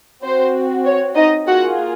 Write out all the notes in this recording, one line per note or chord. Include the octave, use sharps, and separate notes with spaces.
C4 F#4 C5
C#5
D#4 D#5
A#3 F4 F#4 G#4 F#5